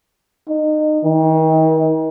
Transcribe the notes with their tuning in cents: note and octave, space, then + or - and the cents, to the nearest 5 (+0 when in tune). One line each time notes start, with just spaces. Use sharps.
D#4 -25
D#3 +40